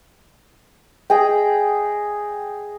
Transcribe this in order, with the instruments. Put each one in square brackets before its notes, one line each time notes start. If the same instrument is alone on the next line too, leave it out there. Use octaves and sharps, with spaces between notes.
[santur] G#4 D#5 G5